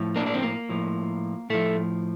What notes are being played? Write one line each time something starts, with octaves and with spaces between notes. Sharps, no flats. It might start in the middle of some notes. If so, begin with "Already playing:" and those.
Already playing: A2 F3
A#3 D4
D4
C4
A#3
A2 F3
A2 F3 A3